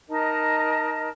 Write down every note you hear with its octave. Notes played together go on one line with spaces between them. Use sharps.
D#4 A#4 D#5 A5